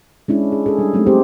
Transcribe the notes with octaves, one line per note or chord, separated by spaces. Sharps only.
G#3 C#4 D4 E4
G#4
G#4 A4
G3 D4
F#3 G#3 A3 C4 D4 D#4
C4 G4 C5